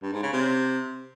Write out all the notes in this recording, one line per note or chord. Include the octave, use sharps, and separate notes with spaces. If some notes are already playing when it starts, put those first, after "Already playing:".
G2
G#2
C#3
C3